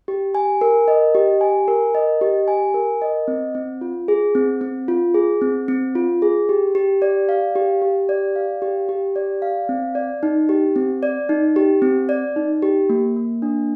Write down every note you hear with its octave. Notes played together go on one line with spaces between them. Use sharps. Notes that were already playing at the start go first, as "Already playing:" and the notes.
G4
G#5
A#4
D#5
G4
G#5
A#4
D#5
G4
G#5
A#4
D#5
C4
C4
F4
G#4
C4
C4
F4
G#4
C4
C4
F4
G#4
G4
G4
D5
F5
G4
G4
D5
F5
G4
G4
D5
F5
C4
D5
D#4
G4
C4
D5
D#4
G4
C4
D5
D#4
G4
A#3
A#3
D4